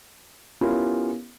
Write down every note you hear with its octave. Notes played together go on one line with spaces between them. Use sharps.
B3 C#4 E4 F4 G4 A#4